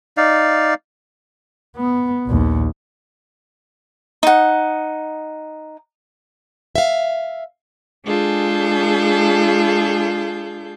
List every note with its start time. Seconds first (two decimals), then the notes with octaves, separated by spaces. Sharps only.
0.17 D#4 D5 F5
1.77 B3
2.26 A#1 D#2
4.23 D#4 F#5
6.76 E5 F5
8.04 G#3 D4 F4 G#4 A4 G6